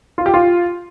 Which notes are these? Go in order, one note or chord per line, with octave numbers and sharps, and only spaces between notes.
F4
G4
F4